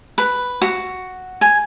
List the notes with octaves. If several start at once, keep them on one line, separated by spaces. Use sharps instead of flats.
B4
F#4
G#5